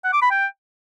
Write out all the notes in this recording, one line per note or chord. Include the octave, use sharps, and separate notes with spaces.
F#5
D6
B5
G5